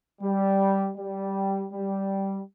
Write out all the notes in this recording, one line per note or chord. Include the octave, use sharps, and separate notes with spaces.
G3
G3
G3